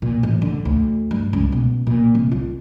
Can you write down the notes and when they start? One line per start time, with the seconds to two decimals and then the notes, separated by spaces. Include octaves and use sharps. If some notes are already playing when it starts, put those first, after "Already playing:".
0.02 A#2
0.23 A1
0.42 D3
0.65 D2
1.11 G2
1.33 C#2
1.52 B2
1.87 A#2
2.15 C2
2.32 F4